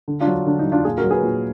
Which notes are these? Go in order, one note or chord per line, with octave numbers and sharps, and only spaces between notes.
D3
D4 F4
F#3
D3 D4
D#4
F#3
D4 F4
A#2 F4 G#4
F#4 A#4
F#3
G#4 B4
A#2